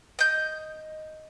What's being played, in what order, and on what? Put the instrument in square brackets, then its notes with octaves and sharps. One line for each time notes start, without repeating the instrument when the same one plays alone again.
[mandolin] D#5 G6